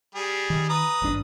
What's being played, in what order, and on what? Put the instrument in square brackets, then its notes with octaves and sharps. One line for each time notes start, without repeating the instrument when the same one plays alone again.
[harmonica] G3 G#4
[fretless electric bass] D#3
[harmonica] B4 A#5 D#6
[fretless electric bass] G#1 G2 D4